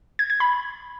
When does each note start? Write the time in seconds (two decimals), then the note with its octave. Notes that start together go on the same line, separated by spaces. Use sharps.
0.19 G#6
0.30 G#6
0.40 B5